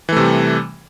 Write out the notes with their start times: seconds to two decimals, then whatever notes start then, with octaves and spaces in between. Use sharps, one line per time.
0.09 E3
0.13 A3
0.16 C3
0.20 G3